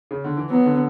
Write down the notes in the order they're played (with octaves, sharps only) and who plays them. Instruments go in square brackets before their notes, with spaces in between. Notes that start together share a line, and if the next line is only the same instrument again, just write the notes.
[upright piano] C#3
D3
E3
[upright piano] F#3 [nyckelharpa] B3
[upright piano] D3